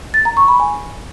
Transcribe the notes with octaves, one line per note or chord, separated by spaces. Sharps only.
A6
A#5
C#6
B5
G#5